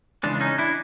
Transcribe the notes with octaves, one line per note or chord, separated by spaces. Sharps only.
C#3 E3 G#3 D4
D4
C#4 D#4
D4 E4